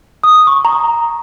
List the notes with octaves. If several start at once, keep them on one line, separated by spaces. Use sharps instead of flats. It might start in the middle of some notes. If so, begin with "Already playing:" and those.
D#6
C#6
A#5